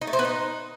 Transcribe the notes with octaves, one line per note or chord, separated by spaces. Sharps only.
D#4
A3
C5
B3
D#4